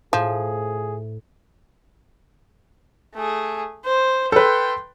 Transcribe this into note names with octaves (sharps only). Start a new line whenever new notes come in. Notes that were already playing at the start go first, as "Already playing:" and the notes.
A2 F3 G#4
A3 G#4
C5
A4 B4 G5 C6